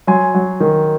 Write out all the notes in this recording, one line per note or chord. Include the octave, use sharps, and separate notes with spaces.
F#3 G#5 C6
F#3
D#3